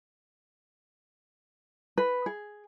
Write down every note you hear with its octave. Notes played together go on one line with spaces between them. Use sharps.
B4
G#4